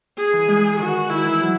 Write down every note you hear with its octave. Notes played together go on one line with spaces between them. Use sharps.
G#4
E3
G#3
D#3 F#4
D#3 E4
E3
F#3